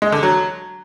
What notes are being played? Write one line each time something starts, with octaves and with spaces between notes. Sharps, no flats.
G#3
D3
F#3